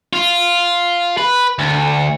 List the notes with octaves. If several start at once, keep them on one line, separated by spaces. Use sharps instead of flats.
F4
B4
D2